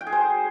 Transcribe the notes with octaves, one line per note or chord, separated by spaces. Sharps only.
G5
G#4
C5